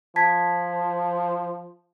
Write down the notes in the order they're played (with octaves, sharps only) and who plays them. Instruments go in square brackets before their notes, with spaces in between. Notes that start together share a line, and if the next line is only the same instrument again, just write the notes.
[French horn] F3 [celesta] A5 G#6 B6